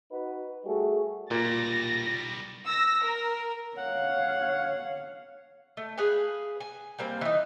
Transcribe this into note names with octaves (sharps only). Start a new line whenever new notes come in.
D#4 F#4 B4
G3 A3 F#4 G#4
B1 A#2 G3 A6 A#6
E6 A#6
A#4
C#5 F5 F#5
A3
G#4 B4 F5 G#5
G#5
G3 A#3 C4
E3 D#4